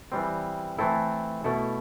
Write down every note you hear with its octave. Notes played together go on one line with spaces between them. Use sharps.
E3 G3 C4
E3 A3 C4 E4 A4
B2 A3 E4 A4